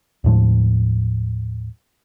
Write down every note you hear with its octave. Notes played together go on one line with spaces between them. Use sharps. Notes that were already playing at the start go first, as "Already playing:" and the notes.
D#2 A2 F3